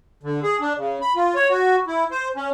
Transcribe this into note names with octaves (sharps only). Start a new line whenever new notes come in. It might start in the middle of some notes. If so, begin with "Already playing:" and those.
D3
G#4
D4
C#3
B5
F4
C#5
F#4
E4
C5
C#4